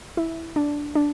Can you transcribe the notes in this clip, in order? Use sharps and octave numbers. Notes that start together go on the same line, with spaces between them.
E4
D4
D4